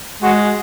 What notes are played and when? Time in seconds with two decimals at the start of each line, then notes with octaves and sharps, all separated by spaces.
0.23 G#3 F#4